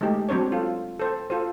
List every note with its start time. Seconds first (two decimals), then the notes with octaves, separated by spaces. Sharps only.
0.01 G#3 A3 D#4 G4
0.29 F#3 C4 D4 C5 C#5
0.52 F4 A4
0.99 A4 C5
1.30 F4 A4 C5